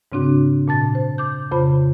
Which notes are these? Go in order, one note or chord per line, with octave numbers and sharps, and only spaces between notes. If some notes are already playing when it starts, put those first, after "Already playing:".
G#2 C#3 C4 D4 F#4
A#2 A5 A6
C5
D6 G6
F2 C#3 F4 C5 B5